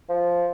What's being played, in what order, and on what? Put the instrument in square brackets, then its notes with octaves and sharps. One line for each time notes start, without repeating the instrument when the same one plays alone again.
[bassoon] F3